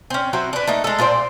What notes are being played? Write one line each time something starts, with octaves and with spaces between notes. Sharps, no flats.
C4 C#4
F#3 C4 E4 F#4
D4 B4
A3 A#3 D#4
G#3 A4
A#2 F4 C5 D5